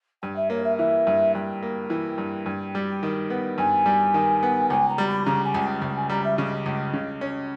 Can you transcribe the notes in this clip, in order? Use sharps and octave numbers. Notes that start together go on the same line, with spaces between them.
G2 G5
E5
A#3 C#5
E5
E3 E5
G2
G2 G5
A#3
E3
G2
G2
G3
D#3
B3
G2 G#5
G3
D#3
B3
C#2 G#5
A#5
G3
B5
C#3 A#5
G#5
C#2
C#2 G5
G#5
G3 A#5
E5
C#3 D#5
C#2
C#3
C#4